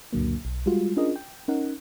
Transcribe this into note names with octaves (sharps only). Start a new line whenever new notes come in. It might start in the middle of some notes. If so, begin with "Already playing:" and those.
C#2 F#2 A#2 D3 F#3 A#3
B1
G3 G#3 F4 F#4
C#4 D4 F4 G#4 A#4 D#5
G5
C#4 D#4 A#4 F#5